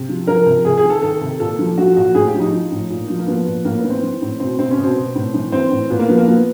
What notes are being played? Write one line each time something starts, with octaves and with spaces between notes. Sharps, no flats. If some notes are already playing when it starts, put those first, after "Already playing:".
Already playing: C3
F3
F3 A#4
C3
C3 G#4
G#4
D#3
A4
D#3 A4
C3
A#2 A4
F3
F3 F#4
A#2 F#4
A2 G#4
G4
F3
D#4
F3
A2
A#2
F3
A#3
F3 B3
A#2
A2 A#3
B3
E3
C4
E3
A2
B2 C4
B2 C4
C#4
B2
C4
B2
A2
E3
E3 C4
A2
A#2 B3
A#3
F3 B3
A#3
F3 B3